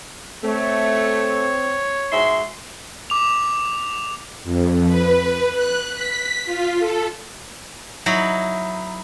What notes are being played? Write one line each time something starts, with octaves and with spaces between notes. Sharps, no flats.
A3 C4 C#5
G#2 F#4 E5 C6
D6 F7
F2
B4
F#6
B6
F4
A4
F#3 D#4 E4 B5